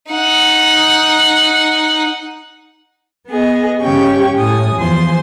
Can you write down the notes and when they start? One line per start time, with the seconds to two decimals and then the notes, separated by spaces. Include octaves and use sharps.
0.11 D#4 F#5
3.28 B3 G#4 D#5
3.80 G2 C#3 C#4 G4 G5 C#6
4.35 A2 G#5 D#6
4.76 E2 F3 C5 G#5 C6